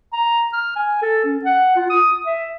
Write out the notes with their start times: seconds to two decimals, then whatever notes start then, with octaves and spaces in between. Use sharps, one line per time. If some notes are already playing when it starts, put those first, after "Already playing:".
0.13 A#5
0.53 F6
0.76 G#5
1.02 A4
1.25 C#4
1.45 F#5
1.76 F4
1.90 D#6
2.26 E5